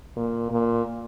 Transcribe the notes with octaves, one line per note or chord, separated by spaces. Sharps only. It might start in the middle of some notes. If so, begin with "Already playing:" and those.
A#2
A#2